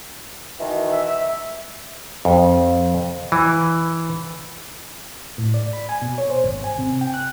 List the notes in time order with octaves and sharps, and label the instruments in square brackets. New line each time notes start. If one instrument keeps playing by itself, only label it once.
[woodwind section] B2 D#3 E3
[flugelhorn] E5
[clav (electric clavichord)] F2
E3
[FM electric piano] A2
D5
B5
G#5
B2
C#5
C5
G#1
G#5
C3
G5
F#6